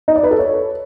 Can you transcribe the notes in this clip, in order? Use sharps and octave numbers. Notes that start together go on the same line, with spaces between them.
D#4
D5
B4
A4
C#5